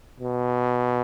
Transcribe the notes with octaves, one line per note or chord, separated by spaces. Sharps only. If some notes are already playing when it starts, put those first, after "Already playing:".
B2